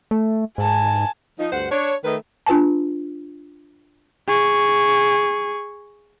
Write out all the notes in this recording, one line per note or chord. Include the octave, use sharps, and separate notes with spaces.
A3
G#2 G#5 A5
F3 D#4
D2 G2 C5 F#5
D4 C#5
D#3 A3 A#4 B4 D#5
D4 F4 B4 G#5 A5
G#4 C#6